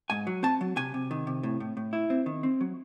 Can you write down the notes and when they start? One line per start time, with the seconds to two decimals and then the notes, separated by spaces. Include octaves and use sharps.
0.10 G#2 G#5
0.27 F#3
0.43 C4 A5
0.61 F#3
0.76 C3 G#5
0.94 C3
1.11 D#3
1.27 C3
1.43 A2
1.60 A2
1.77 A2
1.93 E4
2.10 C4
2.26 D#3
2.43 C4
2.61 F#3